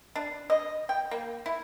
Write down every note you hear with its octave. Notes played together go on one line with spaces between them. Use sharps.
D4
D#5
G5
A#3
E4